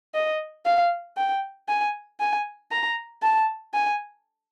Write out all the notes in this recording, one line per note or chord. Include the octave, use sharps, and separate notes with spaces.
D#5
F5
G5
G#5
G#5
A#5
A5
G#5